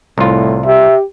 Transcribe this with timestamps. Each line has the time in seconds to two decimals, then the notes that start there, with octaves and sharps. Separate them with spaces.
0.18 C2 A2 F4
0.66 G4 E5